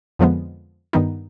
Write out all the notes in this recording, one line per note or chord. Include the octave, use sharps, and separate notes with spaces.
F2 D3 F3 G#3 B3
G2 D#3 B3 D#4